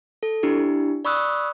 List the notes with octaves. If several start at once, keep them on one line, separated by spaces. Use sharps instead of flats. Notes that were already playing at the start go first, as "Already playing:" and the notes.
A4
D4 E4 G4
D5 B5 C#6 D#6 E6 F#6